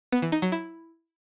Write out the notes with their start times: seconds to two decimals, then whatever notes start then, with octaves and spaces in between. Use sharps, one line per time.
0.12 B3
0.22 E3
0.32 D#4
0.42 F#3
0.52 E4